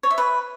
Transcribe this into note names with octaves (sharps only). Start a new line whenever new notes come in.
C#5
E5
B4